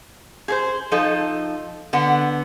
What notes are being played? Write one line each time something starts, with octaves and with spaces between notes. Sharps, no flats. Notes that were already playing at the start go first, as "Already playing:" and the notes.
G#4 A4 C5
F3 D#4 A4
D3 B3 F#5